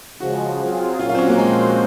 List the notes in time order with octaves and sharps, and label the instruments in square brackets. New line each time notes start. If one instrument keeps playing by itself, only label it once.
[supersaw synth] C#3 F3 G#3 [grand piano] F#4
[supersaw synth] F#3 C4 F4 G#4
[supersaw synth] A#2 F#3 A#3 C#4 F#4 [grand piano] F4
[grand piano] F4
C4
C#4
A#3
[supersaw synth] A#2 F3 C4 F#4 C5 [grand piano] G#3